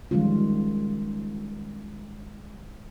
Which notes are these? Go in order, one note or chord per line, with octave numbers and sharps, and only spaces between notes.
D#3 F3 G3 G#3 C#4 F4